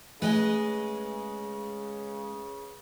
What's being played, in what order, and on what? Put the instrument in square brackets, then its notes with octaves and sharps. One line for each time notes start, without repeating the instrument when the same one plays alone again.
[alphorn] C#3 [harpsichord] G#3 [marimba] A3 [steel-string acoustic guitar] B4 D#5 G#5